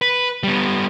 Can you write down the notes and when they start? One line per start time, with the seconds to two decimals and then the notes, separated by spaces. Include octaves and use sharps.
0.02 B4
0.43 G3 B3